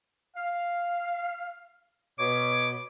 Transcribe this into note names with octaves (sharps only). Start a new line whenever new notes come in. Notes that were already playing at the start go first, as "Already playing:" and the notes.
F5
B2 C#5 D6